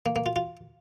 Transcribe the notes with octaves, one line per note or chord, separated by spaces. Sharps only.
A#3
A#3
F4
F4